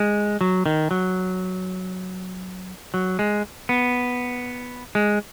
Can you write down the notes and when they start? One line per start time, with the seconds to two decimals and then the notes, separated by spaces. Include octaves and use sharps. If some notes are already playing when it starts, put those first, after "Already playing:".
Already playing: G#3
0.41 F#3
0.66 D#3
0.91 F#3
2.94 F#3
3.19 G#3
3.69 B3
4.95 G#3